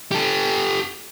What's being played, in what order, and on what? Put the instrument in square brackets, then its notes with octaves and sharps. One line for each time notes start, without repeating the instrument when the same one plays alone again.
[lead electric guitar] G4 A4